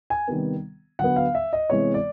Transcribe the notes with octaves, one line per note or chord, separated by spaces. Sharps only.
G#5
C3 D#3 G3 B3
D3 F#3 B3 F#5
F5
E5
D#5
C3 E3 G#3 B3 C#5
D5